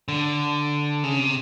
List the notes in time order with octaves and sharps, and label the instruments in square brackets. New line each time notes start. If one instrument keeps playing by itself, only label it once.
[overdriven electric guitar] D3
C#3
C3